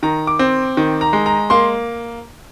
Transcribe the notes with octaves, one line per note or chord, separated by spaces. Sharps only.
D#3 A#5
D6
C4
D#3
A#5
G#3
A#5
A#3 C6